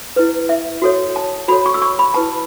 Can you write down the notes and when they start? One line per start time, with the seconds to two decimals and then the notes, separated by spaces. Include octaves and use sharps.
0.16 E4 B4
0.49 E5
0.82 F#4 A4 C#5
1.16 A5
1.48 F#4 A4 C#5 B5
1.66 C#6
1.74 E6
1.82 C#6
1.99 B5
2.14 E4 B4 A5